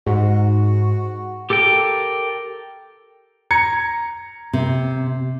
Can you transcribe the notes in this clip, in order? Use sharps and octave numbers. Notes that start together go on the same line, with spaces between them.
G#2 F#4
G4 A4 A#4 G5
A#5 G#6 C#7
C3